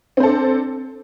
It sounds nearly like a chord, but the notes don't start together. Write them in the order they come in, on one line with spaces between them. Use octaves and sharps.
C4 C5 A4 D4